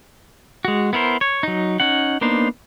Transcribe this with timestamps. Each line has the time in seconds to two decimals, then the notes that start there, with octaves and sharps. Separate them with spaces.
0.65 G#3 F#4
0.93 B3 E4 A#4 C5
1.21 C#5
1.43 F#3 D#4
1.80 C#4 D#4 F#5
2.21 A#3 B3 D4 D#4 C5